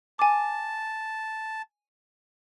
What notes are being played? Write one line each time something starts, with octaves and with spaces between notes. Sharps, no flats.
G#5 A5 D6